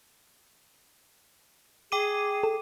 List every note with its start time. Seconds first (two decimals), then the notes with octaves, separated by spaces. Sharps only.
1.92 G#4 G5 D6 D#7
2.43 A4